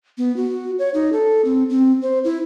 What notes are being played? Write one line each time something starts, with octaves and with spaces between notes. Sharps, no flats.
B3
F#4
C#5
D#4
A4
C4
C4
C5
E4